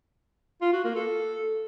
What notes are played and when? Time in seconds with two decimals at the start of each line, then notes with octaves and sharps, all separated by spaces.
0.62 F4
0.73 F#4
0.84 A#3
0.96 A4